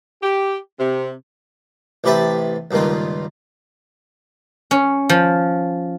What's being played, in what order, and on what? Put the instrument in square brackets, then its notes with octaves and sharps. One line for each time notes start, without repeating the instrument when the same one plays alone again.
[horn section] G4
C3
[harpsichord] A1 C3 G4 B4 E5 A5
C#2 G2 A#2 D#3 F4
[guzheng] C#4
F3